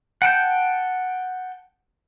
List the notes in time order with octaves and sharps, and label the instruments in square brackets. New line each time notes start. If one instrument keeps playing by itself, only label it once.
[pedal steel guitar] F#5 G5 A5 G6